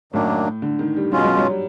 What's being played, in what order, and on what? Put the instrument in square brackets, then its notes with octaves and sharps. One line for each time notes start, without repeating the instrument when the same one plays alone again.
[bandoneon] F#2 D#3 F#3 A#3 D4 [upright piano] A2
[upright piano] D3
D#3
G3
[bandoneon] B2 G#3 C#4 F4 [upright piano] F#3
[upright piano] F#3
F#3
G3